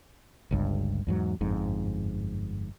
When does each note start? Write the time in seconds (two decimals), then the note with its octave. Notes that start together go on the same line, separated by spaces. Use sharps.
0.51 G1 C#2 G2
1.07 E2 G#2 F#3
1.41 G1 F2 G#2